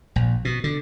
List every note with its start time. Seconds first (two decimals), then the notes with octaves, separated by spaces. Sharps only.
0.16 A#1
0.45 B2
0.64 D3